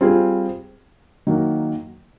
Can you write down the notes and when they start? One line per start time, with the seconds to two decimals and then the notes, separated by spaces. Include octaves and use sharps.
0.01 G3 C4 F4 G#4
1.27 D#3 F#3 A#3